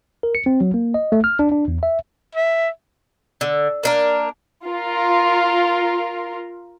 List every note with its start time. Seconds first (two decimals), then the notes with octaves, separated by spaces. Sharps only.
0.23 A#4
0.35 C#7
0.46 C4
0.61 F#3
0.74 A#3
0.94 D#5
1.12 A3
1.24 F6
1.39 D4
1.52 D4
1.68 E2
1.83 E5
2.36 E5
3.41 D3
3.83 A#3 D4 A#4
4.66 F4 A#4